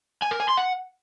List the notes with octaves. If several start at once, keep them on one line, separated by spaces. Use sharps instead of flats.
G#5
A#4
G#5
C6
F#5